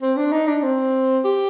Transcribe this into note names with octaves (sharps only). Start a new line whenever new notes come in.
C4
D4
D#4
D4
C4
G4